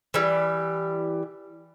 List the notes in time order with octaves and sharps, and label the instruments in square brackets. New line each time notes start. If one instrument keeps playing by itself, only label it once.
[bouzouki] E3 G3